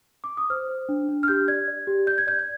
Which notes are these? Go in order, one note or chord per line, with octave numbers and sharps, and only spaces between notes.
D6
D#6
C5 F6
C5
D4
D4
F6
G4 G6
D5 G#6
D5
G4
D5 G6
G#6
D5 G6
G#6